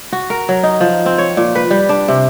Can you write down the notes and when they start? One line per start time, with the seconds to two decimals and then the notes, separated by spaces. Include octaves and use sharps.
0.12 F#4
0.30 A#4
0.49 F#3
0.63 D#4
0.80 F3
1.06 C4
1.18 C#5
1.37 A#2
1.55 B4
1.70 G3
1.89 D4
2.08 C3